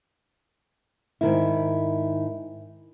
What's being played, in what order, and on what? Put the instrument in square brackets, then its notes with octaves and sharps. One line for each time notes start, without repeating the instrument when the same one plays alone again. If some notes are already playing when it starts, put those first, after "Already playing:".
[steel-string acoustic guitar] G#2 D#3 E4